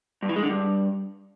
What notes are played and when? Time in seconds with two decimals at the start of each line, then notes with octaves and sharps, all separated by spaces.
0.22 G2
0.29 E3
0.36 G#3
0.43 D3
0.49 G2